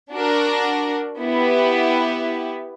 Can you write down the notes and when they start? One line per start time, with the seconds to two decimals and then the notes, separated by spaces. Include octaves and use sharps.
0.12 D4 F#4 A#4
1.19 B3 E4 G4 B4